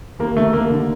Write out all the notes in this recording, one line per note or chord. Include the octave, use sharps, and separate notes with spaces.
D#2 A#3
D3 A3
D#2 A#3
D3